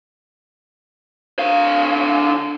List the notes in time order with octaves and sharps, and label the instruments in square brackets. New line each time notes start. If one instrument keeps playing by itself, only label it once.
[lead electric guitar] D3 F5